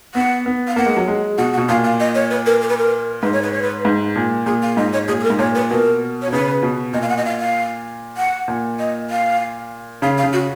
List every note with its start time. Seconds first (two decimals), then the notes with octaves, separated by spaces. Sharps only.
0.15 B3 F#5
0.46 B3
0.68 F5
0.76 A#3 F#5
0.86 G#3
0.97 F#3
1.08 G#3
1.38 B2 F#5
1.53 F#5
1.58 B2
1.69 A#2 F5
1.84 F5
2.00 D#5
2.15 C#5
2.31 B4
2.46 A#4
2.62 A#4
2.69 B4
2.78 A#4
3.23 G#2 B4
3.33 C#5
3.42 B4
3.52 C#5
3.62 B4
3.85 G#2
4.16 A#2
4.46 A#2 G#4
4.62 F5
4.77 G#2 D#5
4.93 C#5
5.08 A#2 G#4
5.20 G#4
5.23 A#4
5.30 G#2
5.39 A#2 C#5
5.55 B4
5.70 B2 A#4
6.22 C#5
6.28 B2
6.32 C#3 B4
6.63 B2
6.93 A#2 D#5
7.02 F5
7.09 F#5
7.18 D#5
7.25 F5
7.40 F5
8.17 F#5
8.48 A#2
8.79 D#5
9.10 F5
10.02 C#3 F5
10.18 F5
10.23 C#3
10.33 F#4